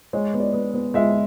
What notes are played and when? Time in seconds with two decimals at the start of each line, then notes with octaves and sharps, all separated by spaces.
0.13 G#3 C#5
0.33 B3
0.40 D5
0.54 B3
0.74 B3
0.94 G#3 E5